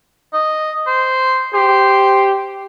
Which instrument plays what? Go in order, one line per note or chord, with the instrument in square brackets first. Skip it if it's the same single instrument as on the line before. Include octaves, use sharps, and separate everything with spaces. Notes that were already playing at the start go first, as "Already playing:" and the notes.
[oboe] D#5
C5
[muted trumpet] G4 [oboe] C5